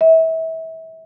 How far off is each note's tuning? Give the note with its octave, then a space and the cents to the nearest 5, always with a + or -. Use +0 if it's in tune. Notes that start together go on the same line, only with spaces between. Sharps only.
E5 -30